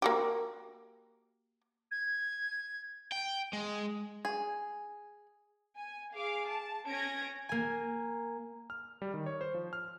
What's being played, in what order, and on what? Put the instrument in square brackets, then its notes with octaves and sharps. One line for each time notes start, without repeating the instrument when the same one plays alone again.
[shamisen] A#3 F#4 G4
[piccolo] G#6
[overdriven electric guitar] G5
G#3
[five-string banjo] G#4
[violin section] G#5
G#4 F5 D6
A5
C#4 G#6 A#6 D7
[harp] A#3 G#5
[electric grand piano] F6
G3
D#3
C#5
C5
F3
F6